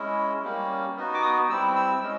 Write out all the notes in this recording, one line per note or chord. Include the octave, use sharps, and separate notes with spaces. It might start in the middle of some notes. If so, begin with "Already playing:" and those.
Already playing: G#3 C#4 E4
G3 A#3 C#4
B3 D#4 F#4
D6
D#6
G3 C4 E4 E6
E6
G#3 C#4